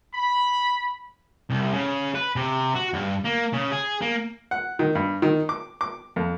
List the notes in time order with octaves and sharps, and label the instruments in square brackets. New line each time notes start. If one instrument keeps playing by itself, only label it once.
[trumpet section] B5
[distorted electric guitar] C2
C#3
B4
C3
F#4
G2
A#3
C#3
G#4
A#3
[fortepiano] F#5
D#3
G2
D#3
D6
D6
F2